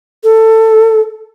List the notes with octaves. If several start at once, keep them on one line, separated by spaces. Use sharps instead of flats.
A4